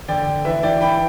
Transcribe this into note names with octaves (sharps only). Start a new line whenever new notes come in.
D3 D5 G5
D3
E3 B4 E5
E3 D5 G5
E3 G5 B5